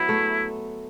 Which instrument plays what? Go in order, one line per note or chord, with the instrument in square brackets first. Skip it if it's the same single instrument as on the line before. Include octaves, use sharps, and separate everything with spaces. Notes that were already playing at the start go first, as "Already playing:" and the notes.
Already playing: [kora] F#3 B3 [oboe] E4
[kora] A3